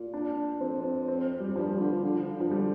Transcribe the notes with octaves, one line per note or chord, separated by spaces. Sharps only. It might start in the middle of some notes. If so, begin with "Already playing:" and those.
Already playing: A#2
D4
F2 C4
C4
C4
G3
G2 F3
A#2
D3
F3
D3
F3
D3
F3
G3